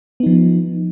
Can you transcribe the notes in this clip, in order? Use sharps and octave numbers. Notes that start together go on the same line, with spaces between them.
F3 B3 D#4